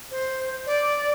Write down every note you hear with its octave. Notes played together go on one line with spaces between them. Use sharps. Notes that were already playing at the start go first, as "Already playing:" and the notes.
C5
D5